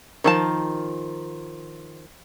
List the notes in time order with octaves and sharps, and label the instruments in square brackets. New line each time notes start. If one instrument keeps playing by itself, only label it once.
[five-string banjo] D#3 F3 A5